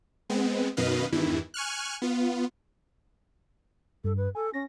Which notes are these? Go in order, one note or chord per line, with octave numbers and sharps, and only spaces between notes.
G#3 B3 C4
F#2 B2 D#3 B4 D#5 F5
E2 G2 D#3 E3 E4
G#5 C#6 F6 F#6
B3 F4
G2 A4
B4
A4 G#5
C#4 A#6